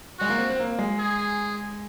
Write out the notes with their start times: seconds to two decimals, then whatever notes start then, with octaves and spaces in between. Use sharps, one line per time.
0.19 G#3 F#4
0.29 A#3
0.38 C4
0.50 C4
0.59 A#3
0.79 G#3
0.99 G#4